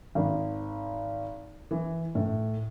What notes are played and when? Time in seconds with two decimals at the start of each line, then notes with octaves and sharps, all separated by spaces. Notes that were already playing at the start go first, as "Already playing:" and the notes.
0.15 G#1
1.71 E3
2.15 A2